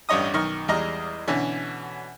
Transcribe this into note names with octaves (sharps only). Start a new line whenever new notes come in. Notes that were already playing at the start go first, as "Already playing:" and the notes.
A1 G2 G3 C#5 D#5 D#6
B1 D#3 D#5 C#6 F6
E2 G3 G#3 D#5 A#5 F6
B2 D3 E3 C#4